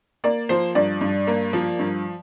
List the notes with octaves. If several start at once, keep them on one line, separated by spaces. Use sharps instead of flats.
A#3 D5
F3 C5
G2 D5
G2
A#3
F3
G2